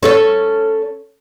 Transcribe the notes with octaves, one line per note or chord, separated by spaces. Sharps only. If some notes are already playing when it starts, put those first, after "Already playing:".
C#4 A4 C#5